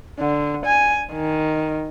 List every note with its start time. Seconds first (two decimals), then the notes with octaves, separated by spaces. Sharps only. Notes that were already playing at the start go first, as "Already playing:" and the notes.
0.19 D3
0.66 G#5
1.12 D#3